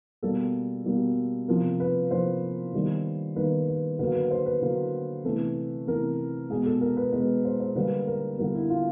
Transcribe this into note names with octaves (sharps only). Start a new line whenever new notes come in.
B2 G3 A#3 A4
B2 G3 A#3
C3 F3 A#3 A#4
B4
C3 F3 A#3 C5
D#3 G3 A#3
D#3 G3 A#3 B4
B4
D3 F#3 A#3 B4
B4
C5
B4
D3 F#3 A#3
C3 E3 A3
C3 E3 A3 A#4
B2 G#3 G#4
A4
A#4
B4
B2 G#3 B4
C5
C5
D3 G3 A#3 B4
A#4
D3 G3 A#3 A#4
E4
F4